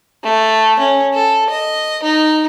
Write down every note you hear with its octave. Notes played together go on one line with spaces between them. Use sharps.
A3
C#4
A4
D#5
D#4